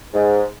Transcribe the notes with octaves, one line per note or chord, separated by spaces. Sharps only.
G#2